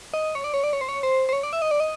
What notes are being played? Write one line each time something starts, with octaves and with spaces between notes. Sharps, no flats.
D#5
C#5
D5
C#5
D5
C#5
C5
C#5
C5
C5
C#5
D5
E5
D#5
D5
D#5